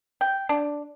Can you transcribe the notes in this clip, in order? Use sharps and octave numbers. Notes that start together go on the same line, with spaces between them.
G5
D4